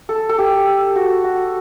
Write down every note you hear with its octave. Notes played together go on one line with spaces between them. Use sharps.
A4
A4
G4
F#4
F#4